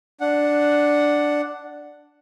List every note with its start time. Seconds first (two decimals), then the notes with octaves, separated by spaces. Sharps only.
0.20 D4 F#5